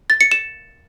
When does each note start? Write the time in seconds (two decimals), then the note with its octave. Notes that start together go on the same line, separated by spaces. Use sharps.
0.10 A6
0.21 C#7
0.32 E7